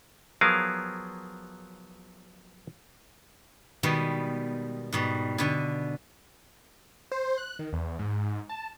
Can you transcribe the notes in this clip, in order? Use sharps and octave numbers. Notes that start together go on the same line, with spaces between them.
F3 F#3 B3 G#4 A#4 F5
B2 D#3 G3 G#3 B3
G#2 B2 G3
B2 D3 G#5
C5
F#6
D#3
E2
G#2
A5